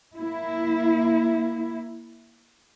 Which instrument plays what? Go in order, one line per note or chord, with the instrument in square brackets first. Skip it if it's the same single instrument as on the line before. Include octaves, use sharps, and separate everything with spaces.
[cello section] A#3 E4